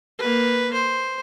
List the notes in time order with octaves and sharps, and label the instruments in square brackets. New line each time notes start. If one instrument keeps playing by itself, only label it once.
[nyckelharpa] A#3 B4
C5